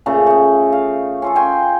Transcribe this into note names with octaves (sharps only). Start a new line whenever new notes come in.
A#2 C#3 A3 A#5
A3 D#5
F5
C#4 F4 A4
D#5 G5 G#5 C6